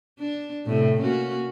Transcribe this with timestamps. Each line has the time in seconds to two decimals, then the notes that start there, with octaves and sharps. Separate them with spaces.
0.19 D4
0.66 A2 C3
1.01 A#3 C#4 F#4